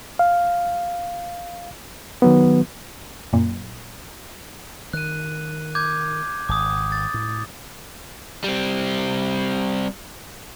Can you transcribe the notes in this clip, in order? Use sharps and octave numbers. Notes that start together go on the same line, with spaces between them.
F5
D#3 F#3 B3
F#2 A#2
D#3 F#6 D#7
D6 G6 G#6
G#1 D6 D#6
A6
A2
G3 C4